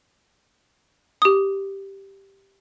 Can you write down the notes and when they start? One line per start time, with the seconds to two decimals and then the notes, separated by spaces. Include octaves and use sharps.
1.22 G4 D#6